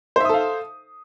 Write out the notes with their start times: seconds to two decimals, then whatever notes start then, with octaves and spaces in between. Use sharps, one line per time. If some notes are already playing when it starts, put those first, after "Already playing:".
0.16 C5
0.20 E5
0.25 D#6
0.29 A4
0.34 F5